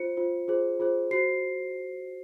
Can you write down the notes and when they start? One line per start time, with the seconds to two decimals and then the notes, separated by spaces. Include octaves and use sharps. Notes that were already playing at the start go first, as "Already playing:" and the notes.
Already playing: F4 C5 C#7
0.17 F4 C5
0.48 F4 G#4 C5
0.80 F4 G#4 C5
1.11 F#4 C5 C7